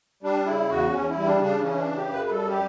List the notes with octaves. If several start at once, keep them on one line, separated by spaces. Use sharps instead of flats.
G3 D4
C#3 E4
E2 F#4
E2 C#4
E4
G3
D4
C#3
D4
E3 C#4
D4
C#3
G4
F#2
B4
B4
G3 A4
G4